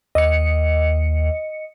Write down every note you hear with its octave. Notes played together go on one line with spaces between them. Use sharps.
D#2 D#5 C#7